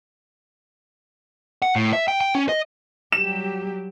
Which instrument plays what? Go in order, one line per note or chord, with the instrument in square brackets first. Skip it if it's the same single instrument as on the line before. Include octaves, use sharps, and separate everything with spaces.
[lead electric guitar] F#5
A2
E5
G5
G5
C#4
D#5
[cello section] F#3 G3 G4 [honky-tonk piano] E7